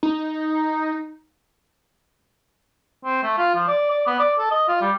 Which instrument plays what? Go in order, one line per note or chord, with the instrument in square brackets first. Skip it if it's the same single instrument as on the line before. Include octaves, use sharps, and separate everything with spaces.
[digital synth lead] D#4
[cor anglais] C4
A3
F4
F3
D5
D5
B3
D5
A4
D#5
F4
G3